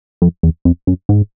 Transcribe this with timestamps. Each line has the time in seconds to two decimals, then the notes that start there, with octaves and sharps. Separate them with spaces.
0.22 F2
0.43 E2
0.65 F2
0.87 F#2
1.09 G#2